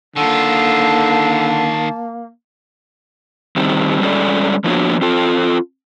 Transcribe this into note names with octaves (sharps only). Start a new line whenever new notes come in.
D3 D#3 A#3 F4 A5
D#3 G3 C4
G3 G#3 C#4 A4 D5
F3 A#3 B3 D4 F#4 C#5
C4 F4 A4